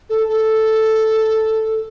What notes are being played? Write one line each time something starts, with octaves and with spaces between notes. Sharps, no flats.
A4
A4